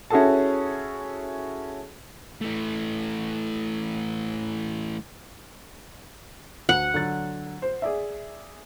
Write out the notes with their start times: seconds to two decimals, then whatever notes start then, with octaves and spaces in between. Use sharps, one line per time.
0.10 C#4 E4 F#4 G#4 A4 A5
2.41 E3 A3
6.69 D2 F#5
6.94 D3 F#3 A6
7.62 C5
7.82 G#4 D5 E5